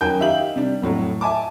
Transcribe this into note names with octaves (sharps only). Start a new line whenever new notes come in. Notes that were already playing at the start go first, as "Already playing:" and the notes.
F#2 D#3 A#4 G5 G#5 G6
D#4 G4 E5 F5 F#7
C3 G3 D4
F2 A2 F#3
E5 G#5 A5 D6